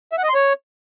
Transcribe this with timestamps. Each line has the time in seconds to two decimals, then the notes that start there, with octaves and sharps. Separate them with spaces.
0.12 E5
0.18 F#5
0.23 D#5
0.29 C6
0.34 C#5